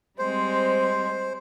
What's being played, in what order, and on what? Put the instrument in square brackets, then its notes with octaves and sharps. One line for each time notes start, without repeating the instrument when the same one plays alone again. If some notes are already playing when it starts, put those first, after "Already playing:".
[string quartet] G3 G#3 C4 [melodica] C5